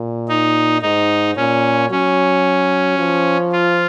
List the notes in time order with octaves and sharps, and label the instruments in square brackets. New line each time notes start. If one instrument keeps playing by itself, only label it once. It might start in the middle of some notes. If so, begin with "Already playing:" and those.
Already playing: [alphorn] A#2
[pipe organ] D#4
[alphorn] G#2 [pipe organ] D#4
[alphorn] A#2 [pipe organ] C#4
[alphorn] F#3 [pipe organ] C#4
[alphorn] F3
[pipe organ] F4